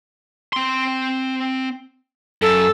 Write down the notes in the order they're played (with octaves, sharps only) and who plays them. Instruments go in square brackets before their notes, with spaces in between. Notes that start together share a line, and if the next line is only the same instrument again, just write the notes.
[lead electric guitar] C4 C6
[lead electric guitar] F#2 [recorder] A4